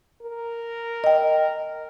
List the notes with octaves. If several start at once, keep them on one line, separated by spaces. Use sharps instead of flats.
A#4
D#5 G5